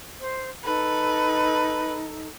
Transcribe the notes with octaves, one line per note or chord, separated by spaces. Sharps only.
C5
D#4 A4 B4